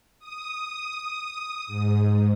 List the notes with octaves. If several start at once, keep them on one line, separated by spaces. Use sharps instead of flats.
D#6
G#2